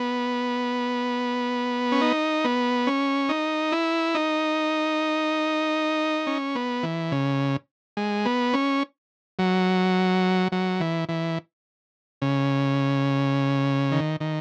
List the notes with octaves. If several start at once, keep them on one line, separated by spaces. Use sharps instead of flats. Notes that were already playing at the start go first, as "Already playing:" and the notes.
Already playing: B3
C#4
D#4
B3
C#4
D#4
E4
D#4
C#4
B3
E3
C#3
G#3
B3
C#4
F#3
F#3
E3
E3
C#3
D#3
D#3